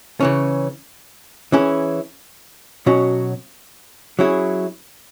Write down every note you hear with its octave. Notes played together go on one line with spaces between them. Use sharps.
C#3 E3 C#4
E3 C#4 E4 G#4
B2 F#3 C#4 F#4
F#3 C#4 E4 G#4